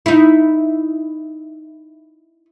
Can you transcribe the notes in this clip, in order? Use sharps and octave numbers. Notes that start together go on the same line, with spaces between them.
D#4 E4